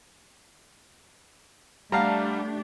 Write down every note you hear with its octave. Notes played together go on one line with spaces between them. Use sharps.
G3 A3 D4 G4 F5 F#5 A5 A#5